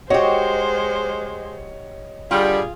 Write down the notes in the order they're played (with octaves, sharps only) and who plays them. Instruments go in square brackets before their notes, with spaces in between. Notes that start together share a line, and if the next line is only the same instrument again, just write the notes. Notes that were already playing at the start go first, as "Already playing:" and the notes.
[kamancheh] G#3 C5 [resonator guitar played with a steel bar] F#4 G4 [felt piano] C#5 D#5
[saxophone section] D3 G3 [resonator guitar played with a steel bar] F4 [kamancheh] G#4